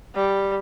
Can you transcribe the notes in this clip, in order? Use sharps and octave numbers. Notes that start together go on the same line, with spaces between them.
G3